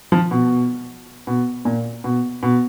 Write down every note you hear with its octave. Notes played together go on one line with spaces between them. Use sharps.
F3
B2
B2
A#2
B2
B2